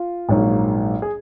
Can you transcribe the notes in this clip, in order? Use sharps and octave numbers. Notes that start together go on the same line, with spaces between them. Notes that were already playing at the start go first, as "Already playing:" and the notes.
Already playing: F4
A#1 G#2 F#3 A#3
G#4